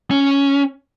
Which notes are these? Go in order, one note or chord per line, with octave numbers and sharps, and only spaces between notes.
C#4